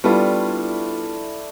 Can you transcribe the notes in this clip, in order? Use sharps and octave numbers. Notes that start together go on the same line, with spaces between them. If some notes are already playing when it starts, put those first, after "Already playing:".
G3 A3 B3 D4 E4 F4